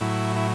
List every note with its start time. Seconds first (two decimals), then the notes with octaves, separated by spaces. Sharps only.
0.01 A2 F#3 E4
0.36 E4